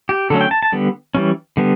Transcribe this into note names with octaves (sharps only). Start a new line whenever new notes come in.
G4
D3 F#3 A3 C#4 A4
G5
A5
A5
D3 G3 B3
E3 G3 C#4
D3 G3 B3